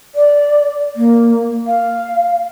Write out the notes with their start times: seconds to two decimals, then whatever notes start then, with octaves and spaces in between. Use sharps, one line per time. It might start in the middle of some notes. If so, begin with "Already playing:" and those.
0.15 D5
0.96 A#3
1.67 F5